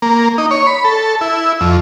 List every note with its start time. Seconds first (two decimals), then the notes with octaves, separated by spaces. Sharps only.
0.02 A#3
0.38 D#4
0.51 C#5
0.67 B5
0.84 A4
1.21 E4
1.61 F2